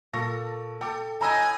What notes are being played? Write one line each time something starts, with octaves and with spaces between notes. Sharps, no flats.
A#2 A4 C#6 A#6
A4 G5 D6
A2 D#5 G#5 A#5 B5 E6